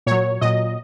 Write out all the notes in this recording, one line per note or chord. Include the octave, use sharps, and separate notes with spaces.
A#2 F#3 C#5
A#2 F#3 D#5